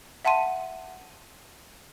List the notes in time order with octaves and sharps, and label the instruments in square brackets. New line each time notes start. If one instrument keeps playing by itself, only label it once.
[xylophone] E5 F#5 A5 C6 D#7